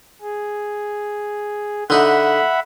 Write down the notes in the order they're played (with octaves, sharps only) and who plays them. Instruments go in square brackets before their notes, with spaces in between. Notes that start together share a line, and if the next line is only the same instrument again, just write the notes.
[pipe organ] G#4
[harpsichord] D3 D#4 [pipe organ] E5 F#5 B5